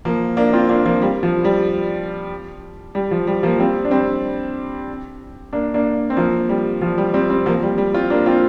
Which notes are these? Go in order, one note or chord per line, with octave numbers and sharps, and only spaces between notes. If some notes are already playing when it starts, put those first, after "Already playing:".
F3 A#3
A#3 D4
C4 F4
A#3 D4
F3 A#3
G3
F3
G3
G3
F3
G3
F3 A#3
G3 C4
D4
G3 C4
A#3 D4
A#3 D4
C4
F3 A#3
G3
F3
G3
G3 C4
G3 C4
F3 A#3
G3
G3
C4 F4
A#3 D4
C4 F4